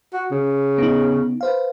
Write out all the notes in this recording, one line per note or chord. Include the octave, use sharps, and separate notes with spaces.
F#4
C#3
B3 D#4
B4 C5 F5